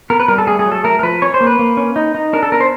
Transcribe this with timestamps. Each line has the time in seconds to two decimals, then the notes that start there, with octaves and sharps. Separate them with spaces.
0.10 B3 A#4
0.20 B4
0.28 G3 A#4
0.38 A4
0.47 A3 G#4
0.59 G#4
0.66 F#3
0.72 A4
0.84 A3 A#4
0.99 A#4
1.03 F3 B4
1.22 C#4 C#5
1.34 C5
1.41 A#3
1.47 B4
1.59 A#3
1.77 C#4
1.96 D#4
2.15 D#4
2.33 D4 A#4
2.43 A4
2.52 B3 A#4
2.61 C5